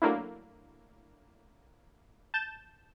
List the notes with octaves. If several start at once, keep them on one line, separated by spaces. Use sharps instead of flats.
F#3 A3 A#3 D4 E4
A5 G6 E7